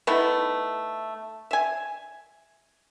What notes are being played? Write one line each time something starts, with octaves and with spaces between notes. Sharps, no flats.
A3 B3 D#4 E4
E5 G#5